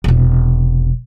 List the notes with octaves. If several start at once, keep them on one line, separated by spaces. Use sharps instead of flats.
E1 C3